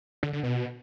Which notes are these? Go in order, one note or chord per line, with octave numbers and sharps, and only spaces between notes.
D3
D3
B2